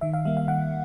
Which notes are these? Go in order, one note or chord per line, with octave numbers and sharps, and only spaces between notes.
D#3 E5
F5
G3 A#3 E5
F5
D#3 F#5